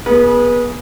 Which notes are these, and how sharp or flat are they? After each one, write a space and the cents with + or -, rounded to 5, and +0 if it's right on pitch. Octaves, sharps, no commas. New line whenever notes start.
B3 -25 G#4 +0 B4 -30